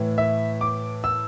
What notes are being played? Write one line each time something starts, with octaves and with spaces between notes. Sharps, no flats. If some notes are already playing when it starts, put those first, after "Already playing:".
Already playing: A2 E3
E5
D6
E6